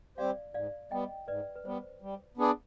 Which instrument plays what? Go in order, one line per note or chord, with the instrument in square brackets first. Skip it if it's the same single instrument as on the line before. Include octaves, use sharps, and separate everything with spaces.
[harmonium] G3 C4 G4 C5 [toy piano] D5 F5
[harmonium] G#2 [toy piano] D5 F5
[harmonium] G3 B3 [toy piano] D#5 G5
[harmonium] G#2 [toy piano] B4 D5
[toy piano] B4
[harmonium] G3 B3 [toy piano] C5
[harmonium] G3
B3 D4 G#4 D5